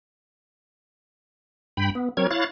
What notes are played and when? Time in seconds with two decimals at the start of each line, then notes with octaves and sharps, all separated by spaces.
1.77 G2 G5 B5
1.95 B3
2.17 F#3 C4 A#4 C#5 G#6
2.31 E4 C#5 F5 F#6 A6